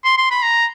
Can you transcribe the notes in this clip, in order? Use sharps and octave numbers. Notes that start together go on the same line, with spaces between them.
C6
C6
B5
A#5